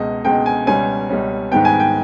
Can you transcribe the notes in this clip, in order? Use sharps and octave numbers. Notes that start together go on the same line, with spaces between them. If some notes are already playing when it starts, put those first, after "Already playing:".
Already playing: C#2 B2 G#3 D#5
C#2 B2 G#3 G5
G#5
C#2 B2 G3 C#4 G#5
C#2 B2 G3 C#4
G#2 D#3 G3 B3 G5
G#5
G5